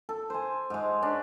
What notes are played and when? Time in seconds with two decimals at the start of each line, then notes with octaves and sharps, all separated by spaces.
0.09 A4
0.30 C5 G#5
0.70 G#2 G#3
1.02 C#4 D4